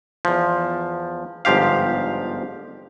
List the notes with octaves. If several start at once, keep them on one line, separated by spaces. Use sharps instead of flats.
E2 F3
G1 G#2 F3 G4 F5